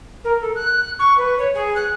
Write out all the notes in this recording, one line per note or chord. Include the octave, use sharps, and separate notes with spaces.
A#4
A4
F#6
C#6
B4
C#5
G#4
F#6